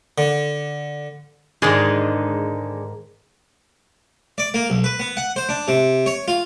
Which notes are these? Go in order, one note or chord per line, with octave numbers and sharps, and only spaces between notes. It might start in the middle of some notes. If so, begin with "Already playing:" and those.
D3
G#2 D3 D#3 G#3 D#4 G#4
D5
A#3
B1
B4
B3
F#5
C5
D4
C3
C#5
F4